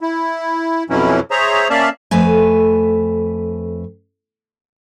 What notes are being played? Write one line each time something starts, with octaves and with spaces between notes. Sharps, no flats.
E4
F2 B2 E3 F#3 C#4 E4
G#4 C5 C#5 E5 A#5
A#3 C#4 D5 E5 F5 A5
F2 A3 B4 G#5